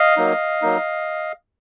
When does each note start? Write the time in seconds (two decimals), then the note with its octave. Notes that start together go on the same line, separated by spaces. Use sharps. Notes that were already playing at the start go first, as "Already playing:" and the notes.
Already playing: D#5 F5
0.17 F#3 A#3 D#4
0.62 F#3 A#3 D#4